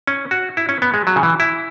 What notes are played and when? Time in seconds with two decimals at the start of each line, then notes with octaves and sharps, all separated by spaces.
0.07 C#4
0.31 F#4
0.57 E4
0.69 C#4
0.82 B3
0.94 G#3
1.07 F#3
1.16 C#3
1.23 E3
1.40 E4